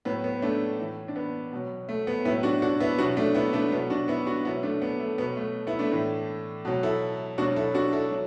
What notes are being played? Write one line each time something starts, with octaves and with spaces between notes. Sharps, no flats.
A2 F#3 B3
B3
A3 D4
A2 E3
D4
B3
B2 F#3
A3
B3
A2 F#3 B3 E4
D4 F#4
D4 F#4
B3 E4
B2 F#3 D4 F#4
A3 D4
B3 E4
A3 D4
B2 F#3 B3
D4 F#4
B3 E4
D4 F#4
B2 F#3 B3 E4
A3 D4
B3
A3
B2 F#3 B3
A3
B3 E4
A3 D4
A2 E3
B2 F#3
E4 A4
B2 F#3 D4 F#4
E4 A4
D4 F#4
E4 A4
F#3